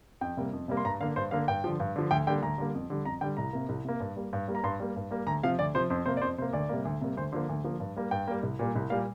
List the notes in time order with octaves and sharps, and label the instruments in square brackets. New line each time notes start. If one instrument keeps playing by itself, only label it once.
[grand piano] F2 G5
C3 G3 A#3
F2
C3 G3 A#3
C6
G2 A#5
D3 A#3 F5
G2 C5
D3 A#3 F5
G2 G5
D3 F3
G2
D3 F3
D2 G5
D3 G3 A#3 G5
D2 A#5
D3 G3 A#3
F2
D3 G3
F2 A#5
D3 G3 G5
C2 A#5
C3 A#3
C2
C3 A#3
G2
G3 A#3
G2
G3 A#3
A#5
G2 C6
G3 A#3
G2
G3 A#3
D2 A#5
C3 F3 F5
D2 D5
C3 F3 C5
F2 C5
C3 A#3 C5
D5
F2 C5
C3 C5
A#3
D2 D5
C3 G3 A#3
D2
C3 G3 A#3
D2 C5
D3 F3 A#3 C5
D2
D3 F3 A#3
G2
G3 A#3
G2 G5
G3 A#3
C2
A#2 G3 A#3
C2
A#2 G3 A#3 F5